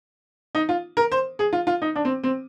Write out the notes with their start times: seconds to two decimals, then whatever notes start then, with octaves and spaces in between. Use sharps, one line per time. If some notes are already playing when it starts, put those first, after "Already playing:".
0.55 D#4
0.69 F4
0.97 A#4
1.12 C5
1.39 G#4
1.53 F4
1.67 F4
1.82 D#4
1.95 D4
2.05 C4
2.23 C4